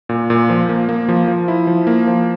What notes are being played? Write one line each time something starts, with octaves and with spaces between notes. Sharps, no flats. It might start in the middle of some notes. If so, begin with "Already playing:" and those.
A#2
A#2
F3
A#3
A#3
F3
F3
E4
F3
A#3
F3